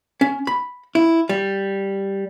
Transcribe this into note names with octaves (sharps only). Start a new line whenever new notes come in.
C#4
B5
E4
G3